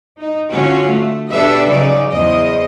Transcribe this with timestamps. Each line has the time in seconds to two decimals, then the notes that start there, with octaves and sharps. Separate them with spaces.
0.19 D#4
0.50 D3 C#4 F4 F#4
0.88 A3
1.30 B2 D4 G4 A4 B4 E5
1.67 C#3 F#3 D#4 D5
2.10 E2 C5 D#5